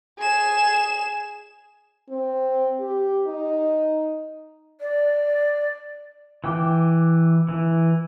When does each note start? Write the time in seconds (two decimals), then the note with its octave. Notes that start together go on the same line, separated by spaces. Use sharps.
0.18 G#4 E7
2.09 C4
2.80 G4
3.27 D#4
4.80 D5
6.44 E3 G5 D6
7.49 E3